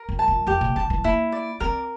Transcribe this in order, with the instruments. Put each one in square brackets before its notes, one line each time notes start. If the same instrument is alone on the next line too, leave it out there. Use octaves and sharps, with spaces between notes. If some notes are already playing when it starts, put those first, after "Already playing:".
Already playing: [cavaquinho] A#4
[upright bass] F2
[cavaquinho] A5
[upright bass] F2
[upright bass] F2 [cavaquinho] G4
[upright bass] A#2
[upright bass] D3 [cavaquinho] A5
[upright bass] E3
[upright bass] A#3 [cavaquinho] E4
[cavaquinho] D5
[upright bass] C4 [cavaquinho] A#4